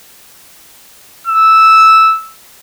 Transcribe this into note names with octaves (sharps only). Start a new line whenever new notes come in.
E6